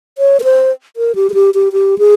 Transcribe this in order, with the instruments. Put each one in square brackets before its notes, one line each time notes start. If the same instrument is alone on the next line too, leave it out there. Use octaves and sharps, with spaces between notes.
[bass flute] C#5
A#4
C5
A#4
G4
G#4
G4
G4
G4
G#4